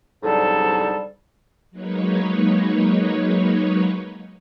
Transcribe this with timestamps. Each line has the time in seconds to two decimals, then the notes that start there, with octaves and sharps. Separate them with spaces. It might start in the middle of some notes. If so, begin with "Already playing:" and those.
0.23 C2 G#2 D3 F#3 G3 A4
1.71 F#3 G#3 A#3 D#4 B4 C#5